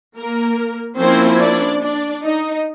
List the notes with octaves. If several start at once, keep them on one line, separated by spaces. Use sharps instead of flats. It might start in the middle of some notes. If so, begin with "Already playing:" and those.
A#3 A#4
F3 A#3 C4 C#4 E4 C5
D4 D5
D4 D5
D#4 D#5